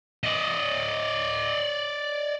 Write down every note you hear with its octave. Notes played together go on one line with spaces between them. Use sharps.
D5 D#5